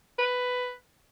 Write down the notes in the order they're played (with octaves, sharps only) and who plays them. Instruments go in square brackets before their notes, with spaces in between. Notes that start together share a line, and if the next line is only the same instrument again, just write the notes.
[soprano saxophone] B4